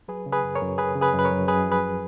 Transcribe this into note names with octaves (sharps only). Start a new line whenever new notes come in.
F#3 G#4 B4
C#3
G#4 B4
F#2
A#4 C#5
F#2
F#3 G#4 B4
C#3
G#4 B4
F#2 B4
A#4 C#5
F#2
F#2 G#4 B4
F3
G#4 B4